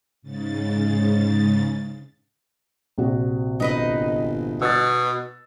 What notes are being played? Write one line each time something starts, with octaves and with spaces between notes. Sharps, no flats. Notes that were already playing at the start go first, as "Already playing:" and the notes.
G#2 C#3 A6
A#1 C3 F#4
G1 D#4 B4 D#5
B2 E6 A6